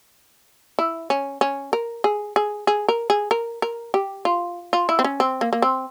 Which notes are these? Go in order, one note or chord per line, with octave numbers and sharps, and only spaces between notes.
E4
C#4
C#4
A#4
G#4
G#4
G#4
A#4
G#4
A#4
A#4
G4
F4
F4
E4
C4
C#4
C4
A#3
A#3
C4